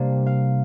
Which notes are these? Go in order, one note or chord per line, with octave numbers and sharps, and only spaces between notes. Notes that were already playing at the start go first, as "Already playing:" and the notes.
Already playing: C3 G3 A#3 D4 F5
F5